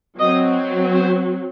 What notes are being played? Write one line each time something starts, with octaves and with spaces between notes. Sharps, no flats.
F#3 C4 D#5
C5